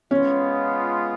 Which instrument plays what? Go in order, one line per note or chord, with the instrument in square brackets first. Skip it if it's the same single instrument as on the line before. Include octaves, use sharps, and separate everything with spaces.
[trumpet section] G#3 B3 F4 [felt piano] C#4